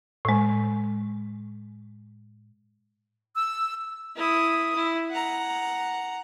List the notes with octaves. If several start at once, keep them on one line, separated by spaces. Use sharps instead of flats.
A2 G#3
E6
E4 D#6
E4
F#5 A#5